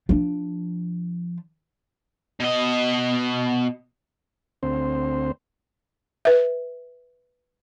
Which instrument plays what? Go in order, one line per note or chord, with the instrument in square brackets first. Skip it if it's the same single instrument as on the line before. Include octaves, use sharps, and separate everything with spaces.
[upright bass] F3 D4
[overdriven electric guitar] B2 D#5
[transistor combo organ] D2 C4 C5
[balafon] B4 E5